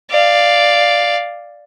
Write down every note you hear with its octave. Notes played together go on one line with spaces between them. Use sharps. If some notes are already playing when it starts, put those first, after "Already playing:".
D5 F5